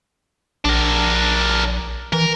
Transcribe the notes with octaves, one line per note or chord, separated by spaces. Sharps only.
A#1 D4 A#4
E3 A#4